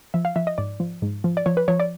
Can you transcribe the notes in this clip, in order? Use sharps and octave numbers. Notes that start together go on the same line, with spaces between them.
F3 E5
F5
F3 E5
D#5
G#2 D5
F3
G#2
F3
D5
F3 C#5
B4
F3 C#5
D5